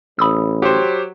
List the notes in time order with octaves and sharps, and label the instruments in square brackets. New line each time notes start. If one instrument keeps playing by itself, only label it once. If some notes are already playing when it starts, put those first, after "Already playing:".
[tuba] A1 [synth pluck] B5 D#6 E6
[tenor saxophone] F#3 [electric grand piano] G4 C5